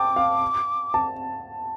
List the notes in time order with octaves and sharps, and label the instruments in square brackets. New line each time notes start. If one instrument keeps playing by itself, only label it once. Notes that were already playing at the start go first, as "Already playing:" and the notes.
Already playing: [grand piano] G5 A5 [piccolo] D6
[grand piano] F5
A5